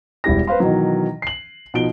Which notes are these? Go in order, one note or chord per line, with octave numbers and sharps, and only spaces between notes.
E1 G3 E4 G4 A#6
B4 C5 F5 C6
B2 D#3 E3 F#3
C7 F#7
B2 F3 D#4 D7 G7